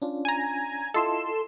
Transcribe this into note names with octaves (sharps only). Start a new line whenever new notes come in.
C#4 D4 F4
G#5 A#5
E4 F4 A4 D#5 C6 E7